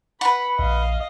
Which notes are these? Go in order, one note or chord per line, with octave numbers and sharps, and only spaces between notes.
B4 F#5 B5
A#1 D#5 F5